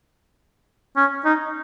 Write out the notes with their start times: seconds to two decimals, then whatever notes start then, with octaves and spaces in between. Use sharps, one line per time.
0.97 C#4
1.25 D#4